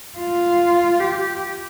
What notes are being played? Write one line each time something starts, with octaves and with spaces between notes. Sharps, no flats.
F4
G4